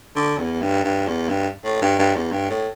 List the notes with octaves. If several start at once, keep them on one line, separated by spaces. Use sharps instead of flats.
D3
E2
G2
G2
E2
G2
A2
G2
G2
E2
G2
A2